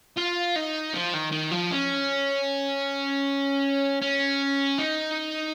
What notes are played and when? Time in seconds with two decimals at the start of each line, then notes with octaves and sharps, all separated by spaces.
0.17 F4
0.56 D#4
0.94 F3
1.13 D#3
1.32 D#3
1.51 F3
1.71 C#4
4.02 C#4
4.79 D#4